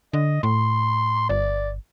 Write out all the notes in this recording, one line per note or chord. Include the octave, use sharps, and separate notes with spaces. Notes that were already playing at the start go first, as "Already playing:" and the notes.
D3 D#5
A2 C6
G1 D5